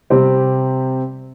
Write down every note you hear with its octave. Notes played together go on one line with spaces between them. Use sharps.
C3 G3 C4 G4